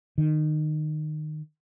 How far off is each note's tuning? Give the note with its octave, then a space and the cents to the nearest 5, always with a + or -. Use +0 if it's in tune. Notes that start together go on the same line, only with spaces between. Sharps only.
D#3 -25